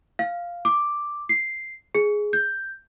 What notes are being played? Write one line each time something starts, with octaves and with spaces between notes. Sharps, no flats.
F5
D6
C7
G#4
G6